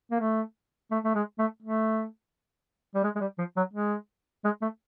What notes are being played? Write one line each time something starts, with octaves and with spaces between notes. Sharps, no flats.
A#3
A3
A3
A3
G#3
A3
A3
G3
G#3
G#3
G3
F3
F#3
G#3
G#3
A3